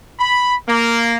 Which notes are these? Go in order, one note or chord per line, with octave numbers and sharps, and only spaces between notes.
B5
A#3